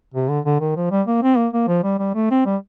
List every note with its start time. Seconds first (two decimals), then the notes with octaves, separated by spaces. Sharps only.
0.14 C3
0.29 D3
0.45 D3
0.61 D#3
0.76 F3
0.91 G3
1.07 A#3
1.23 C4
1.37 A#3
1.53 A#3
1.68 F3
1.83 G3
1.99 G3
2.15 A3
2.31 C4
2.46 G3